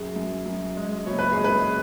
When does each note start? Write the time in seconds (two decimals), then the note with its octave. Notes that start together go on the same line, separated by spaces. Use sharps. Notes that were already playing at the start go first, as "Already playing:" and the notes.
Already playing: F#2 G#4
0.16 F#2
0.46 F#2
0.76 G#3
1.06 F#1 C#5
1.19 B4
1.32 G#3 G#4
1.44 B4